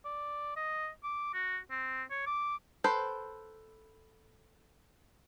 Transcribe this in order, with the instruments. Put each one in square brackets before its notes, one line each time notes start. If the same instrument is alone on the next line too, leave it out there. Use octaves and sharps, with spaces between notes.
[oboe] D5
D#5
D6
F#4
C4
C#5
D6
[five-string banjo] A4 B4 C5 G5